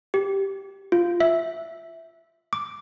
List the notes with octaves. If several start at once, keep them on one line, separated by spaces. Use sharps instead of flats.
G4
F4
E5
D6